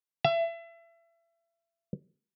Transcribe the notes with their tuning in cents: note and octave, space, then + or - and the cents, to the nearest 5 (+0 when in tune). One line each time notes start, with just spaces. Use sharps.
E5 +30